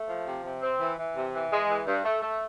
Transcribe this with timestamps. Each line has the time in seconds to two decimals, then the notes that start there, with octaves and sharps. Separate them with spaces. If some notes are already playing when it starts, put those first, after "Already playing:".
Already playing: A3
0.08 F3
0.26 C3
0.44 C3
0.62 C4
0.79 E3
0.98 E3
1.15 C3
1.33 E3
1.51 G#3
1.69 E3
1.87 G2
2.04 A3
2.22 A3